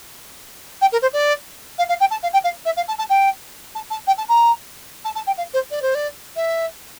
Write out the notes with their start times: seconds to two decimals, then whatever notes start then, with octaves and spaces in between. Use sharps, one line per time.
0.81 G5
0.92 A#4
1.01 C5
1.13 D5
1.78 F5
1.88 F5
2.00 G5
2.10 A5
2.22 F5
2.33 G5
2.44 F5
2.65 E5
2.76 F5
2.88 A5
2.98 A5
3.09 G5
3.75 A5
3.90 A5
4.07 G5
4.17 A5
4.28 A#5
5.04 A5
5.15 A5
5.26 G5
5.37 F5
5.53 C5
5.70 D5
5.82 C5
5.94 D5
6.36 E5